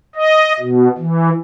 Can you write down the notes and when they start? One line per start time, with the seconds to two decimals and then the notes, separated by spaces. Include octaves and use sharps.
0.15 D#5
0.60 B2
0.98 E3